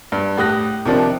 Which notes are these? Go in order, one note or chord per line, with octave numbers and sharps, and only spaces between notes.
G2
A2 G4 D#6 F#6 A#6
C3 D#3 F3 D4